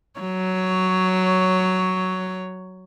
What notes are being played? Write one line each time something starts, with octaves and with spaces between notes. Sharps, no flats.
F#3 C#5